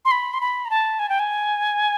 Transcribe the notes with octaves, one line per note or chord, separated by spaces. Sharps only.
C6
B5
C6
B5
A#5
A5
G#5
G5
G#5